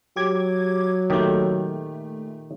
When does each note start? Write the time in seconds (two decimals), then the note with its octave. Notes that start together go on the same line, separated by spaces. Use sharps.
0.16 F#3 G4 D6 G#6
1.10 A#2 D#3 A3 G4